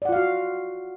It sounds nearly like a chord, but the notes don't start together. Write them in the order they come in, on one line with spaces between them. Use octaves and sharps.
D5 F#5 F4 F5 F#4